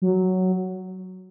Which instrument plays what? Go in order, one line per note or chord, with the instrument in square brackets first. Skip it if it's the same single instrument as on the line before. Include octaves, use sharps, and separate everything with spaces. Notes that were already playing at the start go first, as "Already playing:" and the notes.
[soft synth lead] F#3